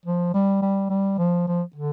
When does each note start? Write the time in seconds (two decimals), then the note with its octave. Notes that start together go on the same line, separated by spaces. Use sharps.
0.05 F3
0.34 G3
0.62 G3
0.90 G3
1.18 F3
1.47 F3
1.76 D3